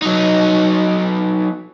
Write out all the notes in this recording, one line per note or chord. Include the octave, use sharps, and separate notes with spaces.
F#3 D#4